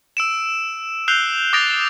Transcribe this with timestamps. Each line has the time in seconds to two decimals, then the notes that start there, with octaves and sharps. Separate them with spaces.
0.17 E6 D7 E7
1.08 E6 F#6 G6 C7 F7 G7
1.53 D6 D#6 A6 A#6 D7 F7